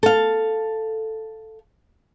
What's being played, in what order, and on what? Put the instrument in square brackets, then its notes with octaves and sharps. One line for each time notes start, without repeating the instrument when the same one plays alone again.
[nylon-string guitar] A4 F5